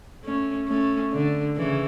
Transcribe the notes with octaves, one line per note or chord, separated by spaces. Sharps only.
A3 C#4
A3 C#4
D3
C#3 E3